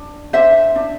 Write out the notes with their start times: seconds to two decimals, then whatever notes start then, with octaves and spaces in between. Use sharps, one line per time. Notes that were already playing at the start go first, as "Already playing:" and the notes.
Already playing: D4
0.33 D4 C5 E5
0.76 D4